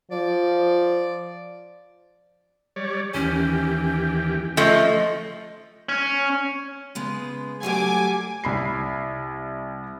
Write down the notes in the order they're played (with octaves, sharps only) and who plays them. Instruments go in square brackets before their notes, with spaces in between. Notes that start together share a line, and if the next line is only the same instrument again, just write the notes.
[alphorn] F3 [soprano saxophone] D5
[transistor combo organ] G3 C#5 D5
[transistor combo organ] D#2 E3 G4 [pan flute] C#4
[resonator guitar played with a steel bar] F3 A3 [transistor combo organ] C#4 [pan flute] D#5
[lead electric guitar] C#4
[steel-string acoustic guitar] C#3 G#3 B3
[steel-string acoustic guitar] F#3 G3 A3 [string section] G#5 D6
[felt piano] C2 B5 C7